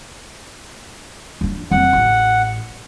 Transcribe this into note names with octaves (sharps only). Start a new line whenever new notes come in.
F3 D4
F2 F#3 F#5
A1